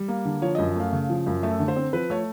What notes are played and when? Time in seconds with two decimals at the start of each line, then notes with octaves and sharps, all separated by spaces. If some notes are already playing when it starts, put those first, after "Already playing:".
Already playing: G3
0.08 A#3
0.25 D3
0.42 F3 C#5
0.55 F#2 D#5
0.76 A3 F5
0.93 C#3
1.10 F3
1.27 F#2
1.43 A3 E5
1.59 D3
1.68 C5
1.76 C4
1.93 F3 B4
2.10 A3 C#5